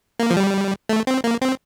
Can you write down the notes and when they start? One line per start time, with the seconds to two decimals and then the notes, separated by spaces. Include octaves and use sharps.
0.19 A#3
0.31 F3
0.37 G3
0.89 A3
1.07 C4
1.24 A#3
1.42 C4